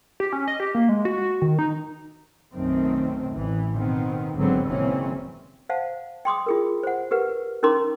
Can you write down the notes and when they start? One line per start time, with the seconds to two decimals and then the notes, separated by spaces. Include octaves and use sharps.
0.20 G4
0.33 C#4
0.48 D#5
0.60 G4
0.75 A#3
0.89 G#3
1.05 F#4
1.18 F#4
1.42 D#3
1.59 D#4
2.54 B1 F#2 D#3 A3 C4
3.32 A1 E3
3.76 B2 D#3 B3 C4
4.36 G#1 D3 F#3 B3 C4
4.67 F#1 A#2 D#3 E3 C4 C#4
5.69 C5 F5 F#5 A5
6.25 G5 C6 D6 D#6
6.46 F4 G#4 A#4
6.83 C5 F#5
7.11 G4 A#4 B4 F#5
7.63 C#4 D#4 A#4 A#5 C6 D6